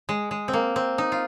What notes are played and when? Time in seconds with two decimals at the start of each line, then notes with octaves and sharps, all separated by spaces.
0.09 G#3
0.31 G#3
0.48 C4
0.53 A#3
0.76 C4
0.98 D#4
1.12 F4